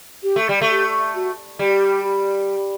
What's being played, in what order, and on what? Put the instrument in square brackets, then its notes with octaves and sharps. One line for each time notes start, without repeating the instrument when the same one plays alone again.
[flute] G4
[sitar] A3
G3
A3
[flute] G4
F#4
[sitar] G3 [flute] G4